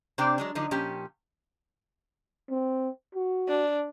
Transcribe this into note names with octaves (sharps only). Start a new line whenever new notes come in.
C3 C4 D4 C5 D5 G5
F#3 G#3 D4
D3 F3 F#3 D#4
A#2 F3 C#4 G4
C4
F#4
D4